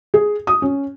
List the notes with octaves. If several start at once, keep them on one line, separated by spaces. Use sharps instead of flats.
G#4
D#6
C#4